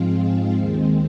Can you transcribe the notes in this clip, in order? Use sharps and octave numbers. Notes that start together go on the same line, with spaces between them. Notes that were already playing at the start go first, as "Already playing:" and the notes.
Already playing: G#2 F3 G#3 C4 F4
D#2 D#3 G#3 C4